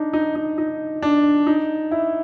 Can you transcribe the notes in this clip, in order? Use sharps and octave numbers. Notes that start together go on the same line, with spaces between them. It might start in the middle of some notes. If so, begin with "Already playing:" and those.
Already playing: D4 D#4
D#4
D#4
D#4
D4
D#4
E4